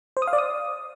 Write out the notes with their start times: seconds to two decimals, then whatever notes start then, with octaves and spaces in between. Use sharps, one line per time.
0.17 C5
0.22 D#6
0.27 F5
0.33 D5
0.38 D#6